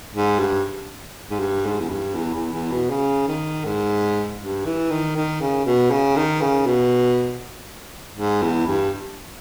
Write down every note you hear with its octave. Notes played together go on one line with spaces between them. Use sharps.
G#2
G2
G#2
G2
G#2
E2
G2
E2
E2
E2
B2
C#3
D#3
G#2
G2
E3
D#3
D#3
C#3
B2
C#3
D#3
C#3
B2
G#2
E2
G2